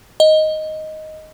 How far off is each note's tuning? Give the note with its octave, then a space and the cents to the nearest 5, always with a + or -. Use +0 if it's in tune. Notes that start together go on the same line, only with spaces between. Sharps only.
D#5 +5